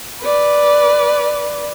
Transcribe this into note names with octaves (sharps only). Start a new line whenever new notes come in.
B4 D5